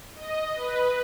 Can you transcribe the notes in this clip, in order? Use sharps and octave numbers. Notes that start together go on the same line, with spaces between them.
D#5
B4